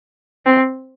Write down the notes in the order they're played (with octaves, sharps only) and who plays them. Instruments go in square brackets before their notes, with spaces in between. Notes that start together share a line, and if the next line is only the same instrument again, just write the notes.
[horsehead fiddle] C4